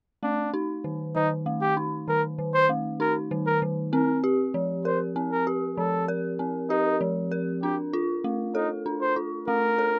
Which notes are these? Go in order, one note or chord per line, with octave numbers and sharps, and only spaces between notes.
A3 D4
D#4
D#3
D#3 D#4
A3
G4
D#4
D#3 A#4
D#3
C5
A3
D#4 A#4
D#3
A#4
D#3
C4 A#4
G4
F3
A#4 C5
C4
A#4
G4
F3 A4
A#4
C4
D#4 G4
F3
A#4
D4 G4
F4
A3
D#4 A4
D4
C5
F4
A3 A#4
A4